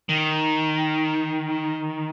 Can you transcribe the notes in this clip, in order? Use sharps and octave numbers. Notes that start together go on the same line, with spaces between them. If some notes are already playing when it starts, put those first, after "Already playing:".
D#3